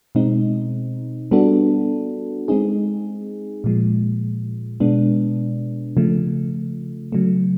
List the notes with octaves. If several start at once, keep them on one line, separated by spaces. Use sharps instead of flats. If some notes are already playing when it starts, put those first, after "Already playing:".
B2 G#3 C4 D#4
G3 B3 D4 F#4 A4
G#3 C4 D#4 G#4
A#2 F3 G#3
B2 G#3 B3 D4
C#3 F3 A3
C#3 F#3 A3